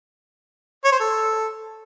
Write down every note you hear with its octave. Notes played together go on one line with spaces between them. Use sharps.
C#5
C5
A4